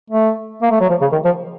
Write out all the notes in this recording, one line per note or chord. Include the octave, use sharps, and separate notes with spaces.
A3
A#3
A3
F#3
F3
C#3
D#3
F3